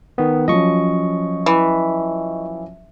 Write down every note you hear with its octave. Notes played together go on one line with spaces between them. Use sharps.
D#3 B3
F3 F#3 C#4 D#5 C#6
E3